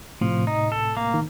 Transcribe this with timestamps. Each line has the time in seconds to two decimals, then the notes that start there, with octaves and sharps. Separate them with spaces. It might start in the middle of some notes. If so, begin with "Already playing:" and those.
0.21 A2 C3 F3
0.47 D#4
0.72 A4
0.97 A#3
1.14 D#3